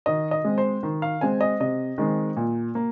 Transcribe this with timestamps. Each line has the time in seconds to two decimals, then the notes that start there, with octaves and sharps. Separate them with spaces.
0.06 D#3 D#5
0.31 D#5
0.45 G#3 C4
0.58 C5
0.83 D#3
1.02 F5
1.21 G#3 C4 G#5
1.41 D#5
1.60 C3 D#5
1.98 D#3 G#3 C4
2.37 A#2
2.75 A#3